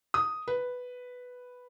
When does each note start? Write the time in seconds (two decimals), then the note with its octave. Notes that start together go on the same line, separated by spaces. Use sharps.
0.14 D#6
0.48 B4